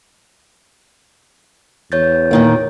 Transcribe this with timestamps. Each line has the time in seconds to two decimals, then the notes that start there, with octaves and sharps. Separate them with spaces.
1.92 E2 C#5 G6 A6
2.31 A#2 D#3 A#3